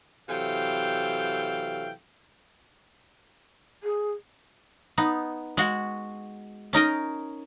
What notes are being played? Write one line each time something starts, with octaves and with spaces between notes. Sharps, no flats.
C3 E3 F#3 A4 F5 G5
G#4
B3 D#4
G#3 F#4
C#4 D#4 A#4 D#5